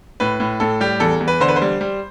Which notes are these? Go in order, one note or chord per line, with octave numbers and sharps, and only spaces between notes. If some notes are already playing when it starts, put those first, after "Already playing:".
A2 B4
A2
A2 A4
G3 G4
E2 A4
E2
B4
D3 C5
B4
C5
G3
G3